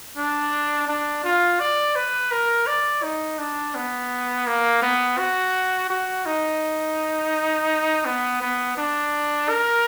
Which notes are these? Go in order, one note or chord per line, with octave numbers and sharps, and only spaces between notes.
D4
D4
F4
D5
B4
A#4
D5
D#4
D4
B3
A#3
B3
F#4
F#4
D#4
B3
B3
D4
A#4